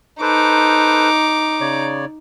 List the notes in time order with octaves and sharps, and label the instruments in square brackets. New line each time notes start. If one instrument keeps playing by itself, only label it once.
[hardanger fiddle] D#4 D6 [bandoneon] A4 B4 C5
[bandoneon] C#3 C#5 D5